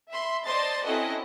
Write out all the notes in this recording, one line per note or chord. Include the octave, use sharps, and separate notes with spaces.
E5 B5 C6
C5 D5 D#5 A5 C6 A6
C4 C#4 E4 F#4 A4 D#5